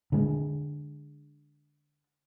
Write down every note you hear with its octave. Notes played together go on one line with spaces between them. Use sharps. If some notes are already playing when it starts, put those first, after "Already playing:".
D3 G#3